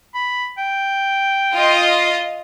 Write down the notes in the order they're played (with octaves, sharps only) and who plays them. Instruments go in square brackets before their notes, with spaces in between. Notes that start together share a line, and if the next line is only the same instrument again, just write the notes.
[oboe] B5
G5
[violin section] F4 D#5